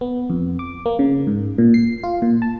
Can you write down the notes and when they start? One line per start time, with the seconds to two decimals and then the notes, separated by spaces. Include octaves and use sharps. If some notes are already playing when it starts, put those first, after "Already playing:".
0.01 B3
0.30 F2
0.59 D6
0.86 A#3
0.99 C#3
1.27 G#2
1.58 A#2
1.74 C7
2.04 F4
2.22 A#2
2.42 A5